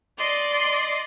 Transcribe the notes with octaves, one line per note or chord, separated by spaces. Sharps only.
D5 D#5 C6